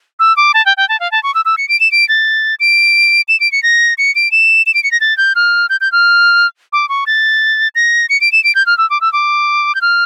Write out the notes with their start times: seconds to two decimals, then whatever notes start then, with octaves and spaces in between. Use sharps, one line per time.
0.20 E6
0.37 D6
0.54 A5
0.66 G5
0.77 G5
0.89 A5
1.00 F5
1.12 A5
1.23 C#6
1.35 E6
1.45 E6
1.58 C#7
1.69 D7
1.80 E7
1.92 D7
2.09 A6
2.60 D7
3.28 E7
3.40 D7
3.52 C#7
3.63 A#6
3.98 C#7
4.15 D7
4.32 E7
4.66 E7
4.74 D7
4.84 C#7
4.91 A#6
5.01 A6
5.18 G6
5.35 F6
5.70 G6
5.81 G6
5.92 F6
6.73 D6
6.89 C#6
7.07 A6
7.75 A#6
8.09 C#7
8.21 D7
8.32 E7
8.44 D7
8.55 G6
8.66 F6
8.78 E6
8.90 D6
9.01 E6
9.13 D6
9.75 G6
9.81 F6